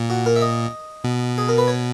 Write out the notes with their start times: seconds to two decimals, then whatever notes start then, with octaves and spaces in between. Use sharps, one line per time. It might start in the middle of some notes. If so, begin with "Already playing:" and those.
Already playing: A#2
0.10 F#4
0.26 A#4
0.36 E5
0.41 D#5
1.04 B2
1.38 G#4
1.49 A#4
1.58 B4
1.68 C#5